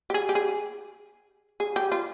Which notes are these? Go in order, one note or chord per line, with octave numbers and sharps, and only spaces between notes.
G4
G#4
G4
G#4
G#4
G4
F4